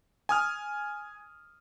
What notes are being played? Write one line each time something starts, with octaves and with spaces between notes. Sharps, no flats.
G#5 D#6 F6